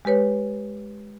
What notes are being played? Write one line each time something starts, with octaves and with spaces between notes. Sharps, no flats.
G#3 G4 B4 C#5